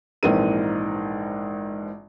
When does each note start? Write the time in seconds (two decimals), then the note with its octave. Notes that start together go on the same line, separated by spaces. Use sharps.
0.23 A#1 G#2 E3 C4 A#4 D#7